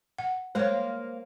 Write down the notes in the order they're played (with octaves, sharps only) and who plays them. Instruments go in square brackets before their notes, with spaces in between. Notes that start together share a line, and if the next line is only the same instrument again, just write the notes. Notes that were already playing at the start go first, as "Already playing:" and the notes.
[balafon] F#5
[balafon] G#3 C#5 [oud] A#3 C5